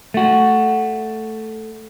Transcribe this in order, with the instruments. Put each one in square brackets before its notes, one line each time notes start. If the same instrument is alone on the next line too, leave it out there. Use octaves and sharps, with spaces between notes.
[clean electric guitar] A3 F#4